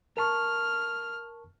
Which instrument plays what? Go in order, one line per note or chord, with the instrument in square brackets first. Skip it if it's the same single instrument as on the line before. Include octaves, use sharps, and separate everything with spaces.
[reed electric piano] A#4 A5 C#6 [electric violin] F6